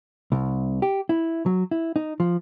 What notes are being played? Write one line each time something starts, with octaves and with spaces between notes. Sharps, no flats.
C2
G4
E4
F#3
E4
D#4
F3